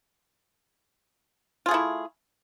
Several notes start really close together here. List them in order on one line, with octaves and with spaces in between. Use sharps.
F4 G#4 A3 E4